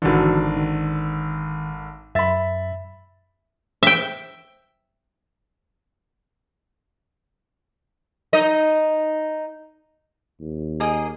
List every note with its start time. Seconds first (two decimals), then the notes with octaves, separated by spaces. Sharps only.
0.02 G#1 D3 E3 F#4
0.57 D#3
2.15 F#2 E5 B5 A6
3.83 E5 G5
8.33 D#4 D#5
10.40 D#2
10.80 A#3 G#4 D#5